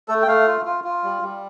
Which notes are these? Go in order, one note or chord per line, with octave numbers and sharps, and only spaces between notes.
A3 A4
G5
A3 F5
F4
F4
F4
G3
G3